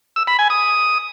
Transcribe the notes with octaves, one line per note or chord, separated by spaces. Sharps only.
E6
B5
G#5
D#6